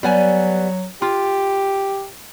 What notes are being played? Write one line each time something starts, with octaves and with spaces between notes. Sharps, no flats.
F#3 G3 B3 G#5
F4 G4